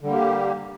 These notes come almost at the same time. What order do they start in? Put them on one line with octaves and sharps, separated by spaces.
D3 G3 A#3 G4